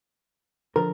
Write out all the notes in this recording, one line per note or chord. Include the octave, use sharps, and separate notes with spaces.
D3 F3 A#4